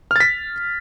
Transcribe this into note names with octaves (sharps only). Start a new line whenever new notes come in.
F6 A6 B6